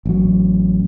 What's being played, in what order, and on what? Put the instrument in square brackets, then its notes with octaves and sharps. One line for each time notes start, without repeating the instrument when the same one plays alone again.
[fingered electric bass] A1 F#3